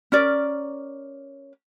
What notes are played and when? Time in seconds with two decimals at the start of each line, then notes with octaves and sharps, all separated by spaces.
0.12 C#4 A#4 D5